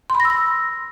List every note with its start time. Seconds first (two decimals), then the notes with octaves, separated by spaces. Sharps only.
0.10 C6
0.15 B5
0.20 A#6
0.25 E6
0.30 A#6